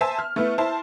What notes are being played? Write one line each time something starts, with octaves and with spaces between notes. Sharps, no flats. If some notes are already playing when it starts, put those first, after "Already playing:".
C5 E5 G#5 A5
F6
A3 B3 E4
E4 C5 A5